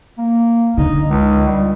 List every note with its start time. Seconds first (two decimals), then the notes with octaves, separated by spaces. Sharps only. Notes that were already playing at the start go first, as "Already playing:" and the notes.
0.18 A#3
0.78 D3 D#4
1.09 C#2
1.48 G3